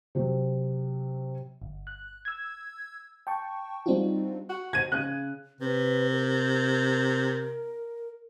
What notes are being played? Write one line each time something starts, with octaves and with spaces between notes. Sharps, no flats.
C3 F#3
G1
F#6
E6 G#6
G5 A5 C#6
G3 C4 D4 D#4 F4 F#4
F#4
G#6 D#7
C#3 F#6
C3 B4
A#4